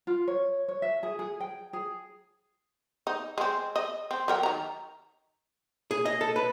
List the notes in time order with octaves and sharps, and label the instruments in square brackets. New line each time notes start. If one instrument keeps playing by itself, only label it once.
[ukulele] F4
C#5
C#5
E5
G#4
G#4
G5
G#4
[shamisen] D#4
G#3 C4
D#5
C4
F#3 A#4 G5
D#3 A#5
[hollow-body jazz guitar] G#4
D#5
A4
B4